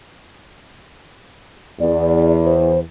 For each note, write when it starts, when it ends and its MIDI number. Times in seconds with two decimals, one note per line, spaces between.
1.80 2.80 40
1.80 2.34 74
2.45 2.79 72